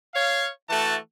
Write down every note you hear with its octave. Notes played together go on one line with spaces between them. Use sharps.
C#5 F5
E3 A3 F#4 A5